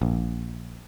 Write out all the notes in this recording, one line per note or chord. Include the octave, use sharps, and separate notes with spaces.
A#1